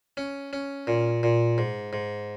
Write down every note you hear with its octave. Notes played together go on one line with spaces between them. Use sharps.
C#4
C#4
A#2
A#2
G#2
G#2